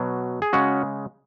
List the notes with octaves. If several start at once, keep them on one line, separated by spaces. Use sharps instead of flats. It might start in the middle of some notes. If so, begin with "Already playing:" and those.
Already playing: B2 F#3
G#4
C#3 G#3 C#4 F#4